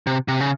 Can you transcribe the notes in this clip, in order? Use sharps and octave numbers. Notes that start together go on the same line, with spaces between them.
C3
C3
C#3